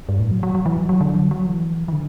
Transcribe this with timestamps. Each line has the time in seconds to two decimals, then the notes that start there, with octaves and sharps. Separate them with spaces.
0.09 G2
0.20 A2
0.31 F#3
0.43 F#3
0.55 F#3
0.66 E3
0.77 F#3
0.89 F#3
1.01 D3
1.16 F#3
1.31 F#3
1.46 E3
1.88 E3
1.93 D3